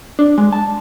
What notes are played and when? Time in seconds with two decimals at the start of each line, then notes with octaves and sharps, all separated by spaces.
0.19 D4
0.38 G#3
0.53 A5